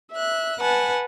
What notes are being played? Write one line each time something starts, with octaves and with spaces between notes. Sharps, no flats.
E5 F#6
B4 F#5 G#5 A5